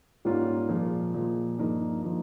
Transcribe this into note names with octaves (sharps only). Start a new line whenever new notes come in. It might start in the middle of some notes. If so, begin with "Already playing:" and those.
G#2 G3 A#3 C#4 F4
A#2 F3 G#3
A#2 F3 G#3
G2 F3 A#3 D#4
F3 A#3 D#4